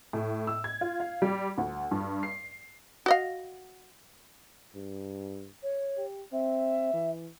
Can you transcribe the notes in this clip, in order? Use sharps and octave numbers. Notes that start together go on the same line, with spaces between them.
A2
E6
G#6
F4
F5
G3
D2
G2
C7
F#4 D#5 F5
G2
C#5
G4
C4 E5
E3